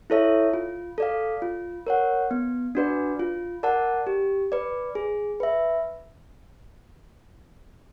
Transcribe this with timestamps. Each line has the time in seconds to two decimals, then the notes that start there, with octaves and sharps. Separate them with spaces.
0.10 E4 A4 C#5 E5
0.53 F4
0.98 A4 D5 F5
1.42 F4
1.87 A#4 C#5 F#5
2.31 B3
2.75 D4 F#4 B4 D5
3.20 F4
3.63 A#4 D5 F#5 A5
4.07 G4
4.52 B4 D5
4.95 G#4
5.40 B4 E5